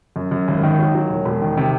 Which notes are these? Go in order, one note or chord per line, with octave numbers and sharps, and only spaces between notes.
F#2
F#2
G#1
D#3
F#3
F#3
E1
E1
D#3
C3